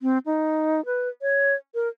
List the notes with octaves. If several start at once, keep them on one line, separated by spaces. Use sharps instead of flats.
C4
D#4
B4
C#5
A#4